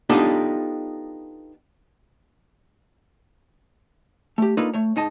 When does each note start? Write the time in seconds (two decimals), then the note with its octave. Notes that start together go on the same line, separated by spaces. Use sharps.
0.09 B3 D4 D#4 F4 G4 A4
4.38 A3 G4
4.57 A#3 D4 D#4 F4 A4 B4
4.74 A3 C#5
4.96 G#2 D#4 D#5 A5